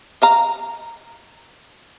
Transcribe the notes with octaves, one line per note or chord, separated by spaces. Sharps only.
D#5 F5 A#5